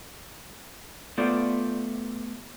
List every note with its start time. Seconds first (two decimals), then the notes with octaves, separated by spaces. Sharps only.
1.18 A3 B3 F4 C5 D5